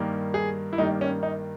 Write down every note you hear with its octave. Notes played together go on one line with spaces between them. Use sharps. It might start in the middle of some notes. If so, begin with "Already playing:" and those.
Already playing: G2 D#3 G3 A#3
G#4
E4
G2 D#3 G3 A#3 D#4
C#4
D#4